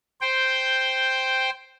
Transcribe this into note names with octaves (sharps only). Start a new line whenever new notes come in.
C5 G5